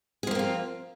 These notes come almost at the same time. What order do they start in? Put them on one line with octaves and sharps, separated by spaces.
G#4 F3 A#3 C4 F4